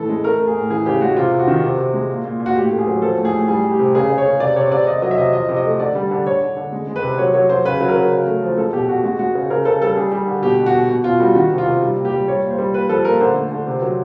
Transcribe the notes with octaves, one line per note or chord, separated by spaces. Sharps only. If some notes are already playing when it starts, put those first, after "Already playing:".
Already playing: A2 E3 A4
G#3
A3 A#4
A3
G#4
A2
E3 G#4
C#3 G4
G#3 F#4
C3 F4
C3
F#4
D#3
C3
C3
G#3
A#2
A#2
A#2
F#4
A2 G4
A3
G#4
F#3
F3 A4
A2
G#4
A2
G3 G#4
G3
G4
C3
C#3 G#4
C#3
C#5
C#3
C3 D5
C3 C#5
C3 D5
C3 D#5
F#3 D#5
E5
C3 D#5
F3 D#5
C3
D#5
A3
D3 D5
G3
D3
D3 C#5
D3
D3
G#3
G#3
B4
C3
F#3 C#5
F#3 C#5
F#3 C5
C#3 B4
F#3
A#4
F#3
C#3
A3
F3
G#3 A4
B2 G4
B2 F#4
G#3 F#4
G#3 F#4
C#3
C#3 A#4
C#3 A4
G3 A4
G3 G#4
G3
D3
B2 G4
B2
F#4
B2
B2
B2 F4
G3 F#4
D#3 F#4
C3
F4
C3
G3
A#2
G4
G3
G3 C#5
A#2
C5
G3
A#2 B4
F3 A4
A#2 A#4
D3 C5
A3
D3
C3
F#3